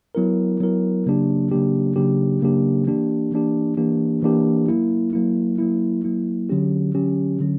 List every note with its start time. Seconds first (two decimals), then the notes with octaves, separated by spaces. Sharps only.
0.15 F#3 B3 E4 A#4
0.60 F#3 B3 E4 A#4
1.06 C#3 F#3 A#3 D4 G4
1.51 C#3 F#3 A#3 D4 G4
1.96 C#3 F#3 A#3 D4 G4
2.42 C#3 F#3 A#3 D4 G4
2.87 E3 A#3 D4 G4
3.32 E3 A#3 D4 G4
3.77 E3 A#3 D4 G4
4.22 E3 A#3 D4 G4
4.68 F#3 A#3 E4
5.13 F#3 A#3 E4
5.58 F#3 A#3 E4
6.04 F#3 A#3 E4
6.49 D3 F#3 C#4 G4
6.95 D3 F#3 C#4 G4
7.40 D3 F#3 C#4